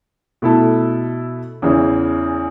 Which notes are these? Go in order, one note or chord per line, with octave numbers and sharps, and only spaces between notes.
B2 A3 E4 A4
E2 C#3 E3